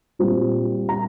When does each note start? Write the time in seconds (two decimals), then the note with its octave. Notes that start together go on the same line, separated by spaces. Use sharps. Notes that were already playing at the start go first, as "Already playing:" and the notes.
0.19 A#2 G3 C4
0.89 A#5